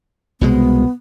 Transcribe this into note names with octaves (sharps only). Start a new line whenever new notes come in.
C2 B2 G#3 B3